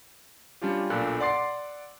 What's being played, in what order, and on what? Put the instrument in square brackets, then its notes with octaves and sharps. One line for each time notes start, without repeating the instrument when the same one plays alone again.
[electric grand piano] G3 C#4 D4 F4 G4
B1 A#2 D4 A4 E6 F#6
D5 F#5 C6 D6 A6 C7